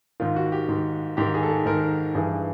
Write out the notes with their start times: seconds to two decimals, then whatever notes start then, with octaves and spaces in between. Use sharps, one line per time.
0.20 G#2 D#3 F4
0.36 F#4
0.52 G4
0.69 G#2 D#3
1.17 G#2 D#3 G4
1.34 G#4
1.43 A4
1.49 G#4
1.66 G#2 D#3 A#4
2.15 G2 E3 G#4